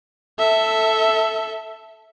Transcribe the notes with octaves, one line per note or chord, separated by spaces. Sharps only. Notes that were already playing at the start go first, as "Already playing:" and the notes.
A4 E5